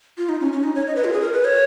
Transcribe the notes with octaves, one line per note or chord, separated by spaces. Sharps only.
F4
D#4
C#4
C#4
D#4
C#5
D#5
B4
F4
G#4
A#4
B4
C#5